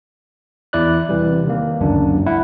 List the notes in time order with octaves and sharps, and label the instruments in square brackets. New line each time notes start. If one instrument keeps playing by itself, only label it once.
[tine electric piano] E2 E4 D5 F#6
C3 E3 G3
D#3 A#3
G1 C#2 F#2 D4
E4 F#5